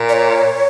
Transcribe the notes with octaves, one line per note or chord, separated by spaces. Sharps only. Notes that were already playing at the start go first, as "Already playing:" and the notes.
Already playing: A#2
D5
C#5